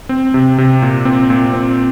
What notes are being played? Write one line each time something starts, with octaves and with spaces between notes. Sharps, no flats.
C4
C3
C3
A#2
C4
A#2
C4